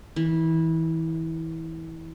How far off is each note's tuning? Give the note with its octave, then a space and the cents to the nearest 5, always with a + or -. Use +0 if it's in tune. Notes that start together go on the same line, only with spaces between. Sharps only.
E3 -25